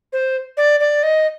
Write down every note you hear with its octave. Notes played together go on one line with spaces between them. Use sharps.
C5
D5
D5
D#5